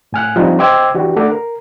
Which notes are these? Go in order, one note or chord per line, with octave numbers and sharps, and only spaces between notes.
A2 G#5 F6 F#6
F3 G3 C4 D4 D#4
C5 D#5 G5 D6 E6 G#6
E3 D4 F#4 G4
A3 D4 A4 D5 F#5
A#4